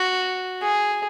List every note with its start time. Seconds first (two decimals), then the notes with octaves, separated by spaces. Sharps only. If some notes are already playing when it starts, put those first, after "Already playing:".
Already playing: F#4
0.62 G#4